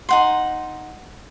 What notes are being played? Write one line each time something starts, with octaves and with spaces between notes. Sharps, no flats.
D#4 F#5 C6